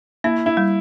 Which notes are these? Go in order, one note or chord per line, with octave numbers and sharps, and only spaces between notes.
A#3 E4
E4
G3